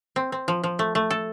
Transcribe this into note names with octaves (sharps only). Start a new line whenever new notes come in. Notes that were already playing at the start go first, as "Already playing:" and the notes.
C4
C4
F3
F3
A3
A3
A4